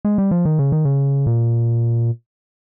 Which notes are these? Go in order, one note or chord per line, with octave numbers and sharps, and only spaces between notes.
G#3
G3
F3
D#3
C#3
D#3
C#3
A#2